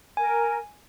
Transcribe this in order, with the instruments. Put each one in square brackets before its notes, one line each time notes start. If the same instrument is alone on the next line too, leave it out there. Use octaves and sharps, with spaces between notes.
[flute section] A#4 [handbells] G#5